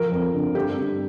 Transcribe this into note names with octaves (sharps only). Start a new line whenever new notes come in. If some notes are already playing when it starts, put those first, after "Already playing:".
Already playing: F3 A#4
F2
D3
G2 G4
G2